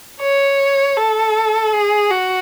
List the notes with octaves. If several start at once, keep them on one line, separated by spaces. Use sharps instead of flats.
C#5
A4
G#4
F#4